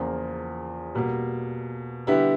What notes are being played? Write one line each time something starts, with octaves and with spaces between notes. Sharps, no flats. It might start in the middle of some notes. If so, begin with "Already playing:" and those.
Already playing: E2 C#3 F3 A#3
B2 G3 A#3
D3 G3 B3 E4 G4